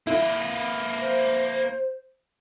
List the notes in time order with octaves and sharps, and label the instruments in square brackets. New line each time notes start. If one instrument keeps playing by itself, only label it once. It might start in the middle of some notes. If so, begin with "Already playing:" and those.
[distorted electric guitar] A#3 B4 [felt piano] E4
[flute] C5